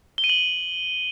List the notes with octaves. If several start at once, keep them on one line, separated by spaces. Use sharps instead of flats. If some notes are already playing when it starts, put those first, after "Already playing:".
G7
D#7
F#7